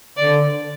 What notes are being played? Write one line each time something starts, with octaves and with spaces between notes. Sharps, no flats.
D3 D5